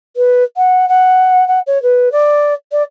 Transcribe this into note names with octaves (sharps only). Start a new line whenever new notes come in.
B4
F#5
F#5
F#5
C#5
B4
D5
D5